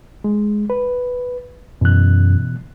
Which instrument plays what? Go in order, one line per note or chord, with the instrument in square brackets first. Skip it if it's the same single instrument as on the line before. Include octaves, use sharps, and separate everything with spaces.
[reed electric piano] G#3
B4
[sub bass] F#2 [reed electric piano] B2 E3 F#6